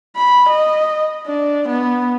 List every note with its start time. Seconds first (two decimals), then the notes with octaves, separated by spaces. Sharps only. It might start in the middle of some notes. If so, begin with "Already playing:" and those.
0.17 B5
0.49 D#5
1.26 D4
1.68 B3